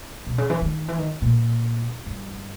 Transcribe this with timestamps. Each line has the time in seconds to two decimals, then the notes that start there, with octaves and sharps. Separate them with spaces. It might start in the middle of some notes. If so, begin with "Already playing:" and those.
0.26 B2
0.38 C#3
0.50 E3
0.62 D#3
0.88 E3
0.98 D#3
1.22 A#2
2.06 G2